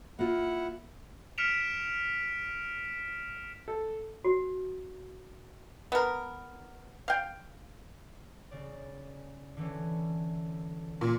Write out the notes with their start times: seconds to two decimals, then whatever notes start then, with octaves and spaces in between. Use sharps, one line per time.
0.19 A#3 E4 F4 F#5
1.38 F6 B6 C#7 D7 E7 F7
3.68 A4
4.25 F#4
5.92 B3 A#4
7.08 F5 G5
8.51 C#3 D5
9.57 D3 E3 C#4
11.01 A#2